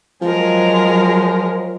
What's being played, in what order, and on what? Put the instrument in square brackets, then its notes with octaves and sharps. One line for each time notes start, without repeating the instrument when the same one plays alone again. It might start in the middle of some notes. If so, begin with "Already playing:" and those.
[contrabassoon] F3 [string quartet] F#3 G#3 A#4